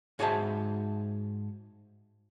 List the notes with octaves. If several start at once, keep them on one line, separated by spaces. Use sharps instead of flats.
G#2 F#4 G#4 C5 E5 A5